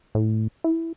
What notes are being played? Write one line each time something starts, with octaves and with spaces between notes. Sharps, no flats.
A2
E4